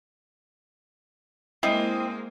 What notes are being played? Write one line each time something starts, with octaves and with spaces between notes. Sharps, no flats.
G#3 A#3 C4 E4 D#5 D#6